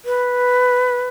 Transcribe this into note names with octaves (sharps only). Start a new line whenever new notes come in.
B4